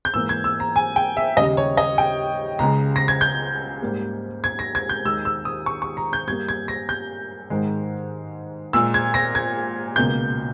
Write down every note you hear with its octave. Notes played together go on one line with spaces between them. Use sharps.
G6
G#2 E3 A#3 E6
G#6
E6
A#5
G#5
G5
E5
D#2 C#3 G3 D#5
C#5
D#5
G5
C#2 C#3 G#3 A#5
A#6
G#6
G6
G#2 G3 A#3
G#6
A#6
G#6
G6
D#2 D#3 G#3 E6
E6
D#6
C#6
C#6
A#5
G6
G2 G3 A#3 G#6
G#6
A#6
G6
G#2 D#3 G#3
A#2 G#3 E6
G#6
A#6
G#6
C#2 B2 A#3 G6